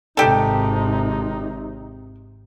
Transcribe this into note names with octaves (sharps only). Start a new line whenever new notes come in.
G#1 C3 D#4 G4 A4